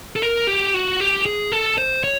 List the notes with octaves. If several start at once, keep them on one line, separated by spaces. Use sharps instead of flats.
A4
A#4
G4
F#4
G4
G#4
A4
C5
C#5